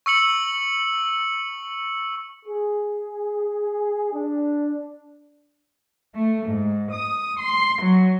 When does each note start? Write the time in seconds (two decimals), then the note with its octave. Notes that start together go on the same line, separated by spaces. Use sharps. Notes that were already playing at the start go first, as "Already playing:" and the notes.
0.06 C#6 E6 C#7 F#7
2.46 G#4
4.12 D4
6.15 A3
6.48 G#2
6.92 D#6
7.40 C6
7.82 F#3